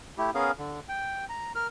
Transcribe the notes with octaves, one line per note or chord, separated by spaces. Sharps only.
A3 E4 G4
B3 C#4 G#4 A#4 F5
D3
G5
A#5
A#4 F6